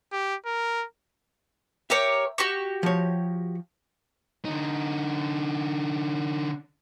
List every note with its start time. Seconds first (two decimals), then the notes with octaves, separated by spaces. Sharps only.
0.12 G4
0.46 A#4
1.90 G4 A#4 C#5 E5
2.38 F#4 G4 C#6
2.83 F3 C#5
4.45 D3 D#4